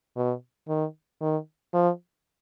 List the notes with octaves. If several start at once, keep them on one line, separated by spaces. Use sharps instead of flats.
B2
D#3
D#3
F3